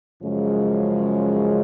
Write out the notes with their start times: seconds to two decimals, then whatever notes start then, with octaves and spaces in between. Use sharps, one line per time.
0.21 F#2 C#3 F3 G#3